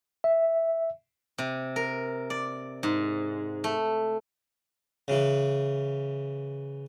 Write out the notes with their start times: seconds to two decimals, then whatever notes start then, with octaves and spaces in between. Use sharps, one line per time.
0.24 E5
1.38 C3
1.76 A#4
2.30 D5
2.83 G#2
3.64 A3
5.08 C#3 E3